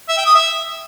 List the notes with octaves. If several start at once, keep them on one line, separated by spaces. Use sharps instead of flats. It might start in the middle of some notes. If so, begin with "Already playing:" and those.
E5
G5
D#6
E5